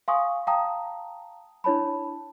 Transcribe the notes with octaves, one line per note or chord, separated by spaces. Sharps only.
F5 G#5 C6 C#6 D#6
F5 G5 A5 A#5 D#6
D4 E4 C#5 A5 B5